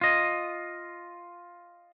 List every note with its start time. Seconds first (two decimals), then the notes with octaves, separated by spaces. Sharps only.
0.01 F4 D#5